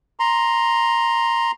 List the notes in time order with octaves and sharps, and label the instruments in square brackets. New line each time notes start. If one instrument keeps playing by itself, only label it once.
[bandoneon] A#5 C6